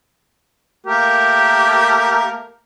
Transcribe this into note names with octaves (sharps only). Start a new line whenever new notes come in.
A3 A#3 G4 A#4